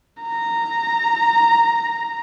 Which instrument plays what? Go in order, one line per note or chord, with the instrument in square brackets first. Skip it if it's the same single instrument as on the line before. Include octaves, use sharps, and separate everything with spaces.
[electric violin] A#5